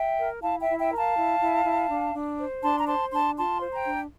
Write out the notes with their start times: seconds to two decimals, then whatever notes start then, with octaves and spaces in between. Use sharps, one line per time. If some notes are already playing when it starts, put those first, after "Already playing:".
Already playing: E5 G5
0.18 A#4
0.42 E4 F5 A5
0.61 E5 G5
0.68 E4
0.79 E5 G5
0.91 A#4
0.97 F5 A5
1.16 E4
1.40 E4
1.65 E4
1.89 D4
2.14 D4
2.39 C5
2.62 D4 A5 C6
2.79 A#5
2.87 C5 A5 C6
3.11 D4 A5 C6
3.36 F4 A5 C6
3.60 C5
3.73 G5 A#5
3.85 D4